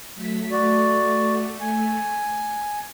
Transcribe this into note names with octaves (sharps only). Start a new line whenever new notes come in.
F#3 A3 B6
A3 F#4 D5
G#5